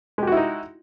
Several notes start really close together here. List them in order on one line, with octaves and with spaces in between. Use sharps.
G#3 G4 F#4 E4 D#4